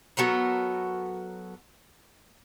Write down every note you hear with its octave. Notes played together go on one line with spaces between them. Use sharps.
F#3 B3 A4 A#4